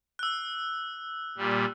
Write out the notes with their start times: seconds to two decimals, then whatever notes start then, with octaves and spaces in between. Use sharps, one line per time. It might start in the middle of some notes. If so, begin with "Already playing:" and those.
0.19 E6 F#6
1.38 A#2 G3